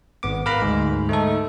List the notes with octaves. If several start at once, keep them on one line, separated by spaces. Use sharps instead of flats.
G#1 B3 D6
A#4 B4 F5 A#5 B5
D2 G#2
A3 D#4 A4